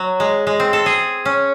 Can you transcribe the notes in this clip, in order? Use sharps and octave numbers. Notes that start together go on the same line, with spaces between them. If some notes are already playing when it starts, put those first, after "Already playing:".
Already playing: F#3
G#3
G#3
C4
A4
G#4
C#4